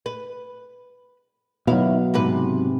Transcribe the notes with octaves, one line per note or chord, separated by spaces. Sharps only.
B4
D#2 B2 F#3 E4 F5
G#2 C3 B4